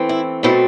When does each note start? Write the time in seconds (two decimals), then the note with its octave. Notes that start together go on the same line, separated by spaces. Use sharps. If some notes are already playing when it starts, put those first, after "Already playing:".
Already playing: E3 A3 C4
0.09 E4
0.43 B2 F#3 A3 C4 E4